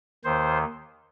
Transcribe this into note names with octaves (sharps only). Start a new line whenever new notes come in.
D#2 D#3 C5